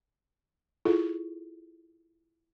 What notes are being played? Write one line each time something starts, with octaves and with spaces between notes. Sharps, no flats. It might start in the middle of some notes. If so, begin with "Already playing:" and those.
E4 F4 G#4 A4